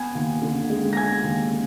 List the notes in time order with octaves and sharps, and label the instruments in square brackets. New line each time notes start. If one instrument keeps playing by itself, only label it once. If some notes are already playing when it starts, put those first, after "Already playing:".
Already playing: [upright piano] B3 G#5 G#6
D#2
D3
G#3
A#6
B3 G#5 G#6
D#2
D3